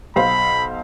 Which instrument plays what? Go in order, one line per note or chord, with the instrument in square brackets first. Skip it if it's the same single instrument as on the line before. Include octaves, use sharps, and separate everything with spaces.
[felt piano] B1 C5 F5 [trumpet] B5